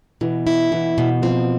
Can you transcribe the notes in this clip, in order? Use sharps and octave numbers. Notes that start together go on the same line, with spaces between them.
B2 E3
E4
B2 E3
B2
F3 C4